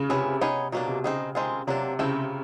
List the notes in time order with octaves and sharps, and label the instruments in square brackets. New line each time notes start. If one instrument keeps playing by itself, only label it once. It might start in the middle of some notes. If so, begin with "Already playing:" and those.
Already playing: [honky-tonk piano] C#3
[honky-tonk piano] C3 [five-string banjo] C#4 E4 G#4 B4
[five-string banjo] B3 D#4 G#4 C#5
[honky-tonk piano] B2 [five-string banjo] D#3 F#3 A#3 D4
[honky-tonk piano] C3
[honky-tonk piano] C#3 [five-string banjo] C4 D#4 G#4
[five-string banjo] D#3 G#3 C4 F4 G#4
[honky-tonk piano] C3 [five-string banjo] F#3 A#3 D4
[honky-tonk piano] C#3 [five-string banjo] A3 C4 E4